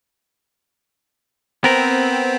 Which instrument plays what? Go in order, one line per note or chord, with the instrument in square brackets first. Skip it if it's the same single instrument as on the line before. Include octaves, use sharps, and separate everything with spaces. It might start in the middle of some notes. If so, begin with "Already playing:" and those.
[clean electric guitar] B3 A#4 [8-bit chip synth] C4